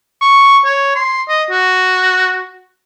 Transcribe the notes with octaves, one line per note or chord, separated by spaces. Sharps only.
C#6
C#5
C6
D#5
F#4